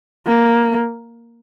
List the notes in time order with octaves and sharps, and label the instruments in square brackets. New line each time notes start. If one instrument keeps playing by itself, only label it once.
[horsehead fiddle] A#3